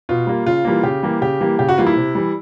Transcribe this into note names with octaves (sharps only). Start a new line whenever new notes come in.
B2 F4
G3 A#3
C#3 F4
E3 G3 A#3
C#3 G4
E3 G3 A#3
C#3 G4
E3 G3 A#3
C#3 G4
F#4
E3 G3 A#3 F4
E4
C3
E3 G3